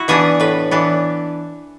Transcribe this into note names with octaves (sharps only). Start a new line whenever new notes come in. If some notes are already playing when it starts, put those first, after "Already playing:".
Already playing: E4 F#4
E3 B3 D4 G#4
A2 B4
E3 B3 D4